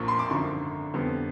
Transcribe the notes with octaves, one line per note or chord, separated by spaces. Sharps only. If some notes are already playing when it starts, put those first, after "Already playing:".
Already playing: A#1 A#2 F3 A#3 C#6
C6
D6
G#1 F#2 D3 F3 C#6
F2 D3 G3 B3